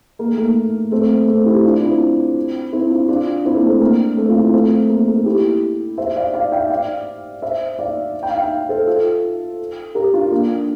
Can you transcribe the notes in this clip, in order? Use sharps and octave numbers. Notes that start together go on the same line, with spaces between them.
A#3
A3
A#3
A3 C4
A3 C4
E4 G4
D4 F4
C4 E4
C4 E4
D4 F4
D4 F4
C4 E4
A#3
A3 C4
A#3 D4
A3 C4
F4
C4 E4
A3 C4
A#3
A#3
E4 G4
C5 E5
D5 F5
D5 F5
E5 G5
D5 F5
C5 E5
D5 F5
G5
F5
E5 G5
A4 C5
F4 A4
G4 A#4
D4 F4
A#3 D4